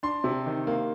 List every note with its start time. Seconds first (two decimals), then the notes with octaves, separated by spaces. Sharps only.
0.03 D4 C6
0.24 C3
0.46 D#3
0.67 A#3